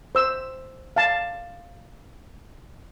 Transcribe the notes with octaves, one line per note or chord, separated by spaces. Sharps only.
C5 E6
F5 A5